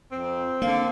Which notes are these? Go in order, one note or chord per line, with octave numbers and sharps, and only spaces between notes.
F2 C4
D3 A#3 F5